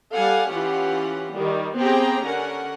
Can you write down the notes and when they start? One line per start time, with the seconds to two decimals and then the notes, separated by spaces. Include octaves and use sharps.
0.14 G3 A4 F5 F#5 G#5
0.52 E3 C#4 F4 G4 F#5
1.35 D#3 G3
1.78 B3 C4 G4 G#4 G5 A#5
2.23 D3 C#4 A#4 F#5